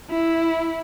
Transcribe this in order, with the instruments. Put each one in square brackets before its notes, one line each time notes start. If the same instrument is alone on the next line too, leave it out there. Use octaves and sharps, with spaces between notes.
[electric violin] E4